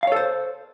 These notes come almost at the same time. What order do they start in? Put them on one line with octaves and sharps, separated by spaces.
F5 C#5 A4 C5